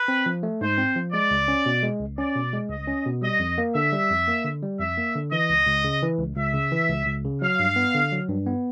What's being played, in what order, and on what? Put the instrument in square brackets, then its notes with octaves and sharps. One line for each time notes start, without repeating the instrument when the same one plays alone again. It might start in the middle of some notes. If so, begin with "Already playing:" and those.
Already playing: [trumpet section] B4
[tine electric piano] C4
F3
A3
[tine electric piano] G#2 [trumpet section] C5
[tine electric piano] C4
F3
[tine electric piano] G#3 [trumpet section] D5
[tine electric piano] C#2
C#4
B2
G#3
C#2
[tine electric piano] C#4 [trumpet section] D5
[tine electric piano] B2
G#3
[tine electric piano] C#2 [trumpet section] D#5
[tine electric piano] C#4
B2
[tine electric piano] G3 [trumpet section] D#5
[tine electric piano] F2
A#3
[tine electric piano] D3 [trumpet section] E5
[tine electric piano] G3
F2
A#3
D3
G3
[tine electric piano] F2 [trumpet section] E5
[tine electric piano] A#3
D3
[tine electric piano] E3 [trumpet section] D#5
[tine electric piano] C#2
C#2
C#3
E3
C#2
[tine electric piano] C#2 [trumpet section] E5
[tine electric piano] C#3
E3
C#2
C#2
C#3
[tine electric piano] F#3 [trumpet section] F5
[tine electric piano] G2
B3
D3
F#3
G2
B3